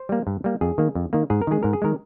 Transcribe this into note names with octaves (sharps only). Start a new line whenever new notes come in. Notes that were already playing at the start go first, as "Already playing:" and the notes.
Already playing: C5
G3 A#3
G2
G3 A#3
F2 G#4
D#3 A#3
F2
D#3 A#3
G#2 G#4
A#4
D#3 G#3 G#4
G#2 A#4
G#4
D#3 G#3 A#4